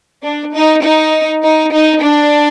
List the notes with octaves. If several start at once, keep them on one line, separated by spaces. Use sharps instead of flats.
D4
D#4
D#4
D#4
D#4
D4